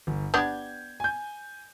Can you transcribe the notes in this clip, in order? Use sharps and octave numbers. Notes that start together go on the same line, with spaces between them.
G1
B3 D4 G4 G6 G#6
G#5 G6